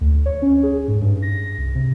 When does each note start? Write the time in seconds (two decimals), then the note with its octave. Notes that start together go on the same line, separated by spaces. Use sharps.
0.01 D2
0.26 C#5
0.42 C#4
0.63 G#4
0.88 G#2
1.01 G2
1.22 A#6
1.58 C2
1.75 C3